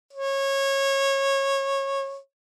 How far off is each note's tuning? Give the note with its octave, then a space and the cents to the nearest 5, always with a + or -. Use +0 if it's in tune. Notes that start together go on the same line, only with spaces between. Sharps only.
C#5 -20